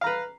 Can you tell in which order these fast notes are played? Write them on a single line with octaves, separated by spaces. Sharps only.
F5 A#5 B4